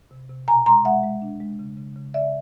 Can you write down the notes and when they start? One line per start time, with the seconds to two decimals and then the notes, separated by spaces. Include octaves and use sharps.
0.11 C3
0.29 C3
0.48 B2 G#5 A#5
0.66 G#3 A#5 C6
0.85 G#3 E5 F#5
1.03 G#3
1.22 D4
1.40 G#3
1.59 C#3
1.77 C#3
1.96 C#3
2.14 C#3 D5 E5